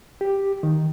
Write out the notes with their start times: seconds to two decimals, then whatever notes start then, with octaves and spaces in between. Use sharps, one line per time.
0.21 G4
0.63 D#3